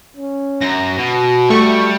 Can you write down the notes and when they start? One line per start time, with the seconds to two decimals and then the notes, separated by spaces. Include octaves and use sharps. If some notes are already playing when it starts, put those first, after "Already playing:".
0.17 C#4
0.61 F#2 A#6
0.97 B2 F#4
1.50 G3 A3 C#6